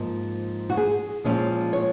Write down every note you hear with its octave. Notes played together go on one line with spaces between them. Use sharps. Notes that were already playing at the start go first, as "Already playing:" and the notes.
Already playing: G#2 F3 A#3
F#4
G#4
A#2 F3 G#3 C#4
C#5